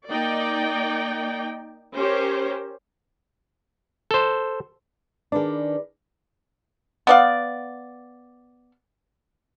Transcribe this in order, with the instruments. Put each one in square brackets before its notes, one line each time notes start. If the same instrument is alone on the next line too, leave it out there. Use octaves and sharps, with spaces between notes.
[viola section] A#3 D#4 D5 G5
C#4 G4 A#4 C5
[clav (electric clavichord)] A4 C5
[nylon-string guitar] D#3 D4 [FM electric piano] G#4 B4 D5
[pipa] B3 D5 F5